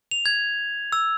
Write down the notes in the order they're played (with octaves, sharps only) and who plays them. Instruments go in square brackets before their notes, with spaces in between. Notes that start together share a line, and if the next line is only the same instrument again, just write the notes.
[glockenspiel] F7
G#6
E6